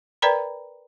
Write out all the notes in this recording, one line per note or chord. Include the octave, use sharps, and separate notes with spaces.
A#4 B4 D5 G5 A#5 B5